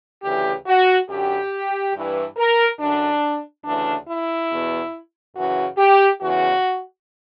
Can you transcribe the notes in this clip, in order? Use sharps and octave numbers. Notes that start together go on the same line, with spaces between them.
D2 C#3 E3 G4
F#4
F#2 D3 G4
G2 E3
A#4
F#2 D3 D4
D2 C#3 E3 D4
E4
E2 B2
F#2 C#3 E3 F#4
G4
E2 C#3 E3 F#4